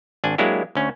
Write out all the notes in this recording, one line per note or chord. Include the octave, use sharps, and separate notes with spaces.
G#1 D4 G#5
F#3 G#3 A#3 D4 E4 G4
D2 C#4